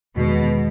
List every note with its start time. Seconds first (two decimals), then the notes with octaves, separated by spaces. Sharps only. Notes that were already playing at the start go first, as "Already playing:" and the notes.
0.16 E2 B2 D#3 G#3